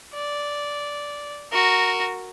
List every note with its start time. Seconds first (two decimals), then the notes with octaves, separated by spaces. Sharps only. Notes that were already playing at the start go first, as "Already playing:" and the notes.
0.14 D5
1.52 F#4 A#4